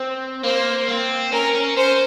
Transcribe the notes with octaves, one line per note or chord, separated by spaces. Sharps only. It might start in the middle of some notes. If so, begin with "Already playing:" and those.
Already playing: C4
A#3 C5
C4
C#4 A#4
C#4
C#4 C5